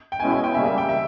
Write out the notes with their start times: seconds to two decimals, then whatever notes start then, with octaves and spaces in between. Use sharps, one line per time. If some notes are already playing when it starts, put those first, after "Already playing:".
0.12 G5
0.20 B2 G#3 C#4 E4 G#5
0.32 G5
0.44 G5
0.54 C#3 G3 A#3 E5
0.66 E5
0.78 G5
0.89 E5